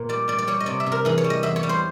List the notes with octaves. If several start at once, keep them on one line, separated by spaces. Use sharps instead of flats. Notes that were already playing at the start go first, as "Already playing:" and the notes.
Already playing: A#2
G3 D5
G3 D5
D5
G3 C#5
D#5
C3 D5
E5
C3
A#4
E3 G#4
C#5
G3
D#5
E2 E5
C#5
G3
C5